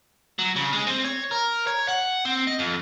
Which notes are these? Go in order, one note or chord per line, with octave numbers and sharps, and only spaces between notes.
F#3
C#3
G#3
C4
C#5
A#4
C#5
F#5
C4
D#5
F2